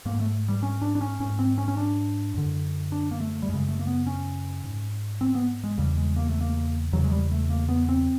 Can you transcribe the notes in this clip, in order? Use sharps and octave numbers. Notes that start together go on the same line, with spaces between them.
G#2 A#3
A3
G3
C#4
D4
D4
C#4
G#2 C#4
C4
C#4
C#4
D4
F#2 D3
D4
A#3
A3
G3
F#2 C#3 G#3
A3
A#3
B3
C#4
G#2
C4
B3
G#3
E2 C#3 G3
G#3
A#3
A3
A#3
E2 C#3 F#3
G#3
G3
A3
A#3
B3
C4